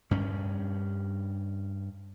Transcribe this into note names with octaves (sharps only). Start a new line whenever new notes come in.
G2 C#4